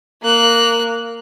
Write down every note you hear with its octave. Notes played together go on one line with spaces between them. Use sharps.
A#3 F#6